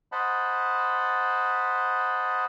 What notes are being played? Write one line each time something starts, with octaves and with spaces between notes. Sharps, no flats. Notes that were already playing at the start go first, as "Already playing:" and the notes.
C5 D#5 F#5 A5 B5